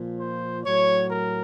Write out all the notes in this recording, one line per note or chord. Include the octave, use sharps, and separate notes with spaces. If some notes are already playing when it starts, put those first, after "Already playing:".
Already playing: A#2 F3
C5
A2 F#3 C#5
A#4